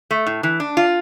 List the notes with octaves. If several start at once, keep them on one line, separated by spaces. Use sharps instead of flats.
A3
A2
E3
D4
F4